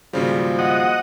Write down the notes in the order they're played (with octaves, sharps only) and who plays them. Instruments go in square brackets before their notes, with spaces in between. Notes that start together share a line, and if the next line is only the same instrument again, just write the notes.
[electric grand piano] G#1 C#3 G3 [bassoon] F3 [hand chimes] A#3 F#4 G#4
[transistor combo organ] D#5 F#5